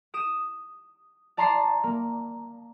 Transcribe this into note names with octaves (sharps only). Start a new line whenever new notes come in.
D#6 D7 E7
D5 A5 A#5 C6 D6 C7
A#3